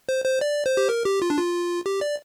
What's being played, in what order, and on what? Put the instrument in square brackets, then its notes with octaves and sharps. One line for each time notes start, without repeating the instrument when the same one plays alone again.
[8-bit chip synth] C5
C5
D5
C5
G4
A#4
G4
F4
D4
F4
G4
D5